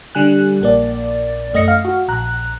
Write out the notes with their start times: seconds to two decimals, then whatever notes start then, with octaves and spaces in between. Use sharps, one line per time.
0.15 D3 G3 G#5 F#6
0.61 A#1 A#3 D5
1.54 F#2 A3 D#5 A#6 C#7
1.68 F5
1.85 F#4
2.08 A#1 A#5 F#6